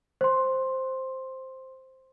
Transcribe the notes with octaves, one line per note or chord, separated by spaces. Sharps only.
C5 C6